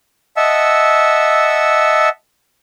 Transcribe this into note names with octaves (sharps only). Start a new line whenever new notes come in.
D#5 E5 F#5 A5 E6